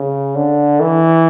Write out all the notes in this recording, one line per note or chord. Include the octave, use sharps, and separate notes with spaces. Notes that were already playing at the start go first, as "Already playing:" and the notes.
Already playing: C#3
D3
E3